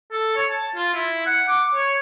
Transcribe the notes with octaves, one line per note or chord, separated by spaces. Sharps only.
A4
C#5
A5
F4
E4
F#5
D6
C#5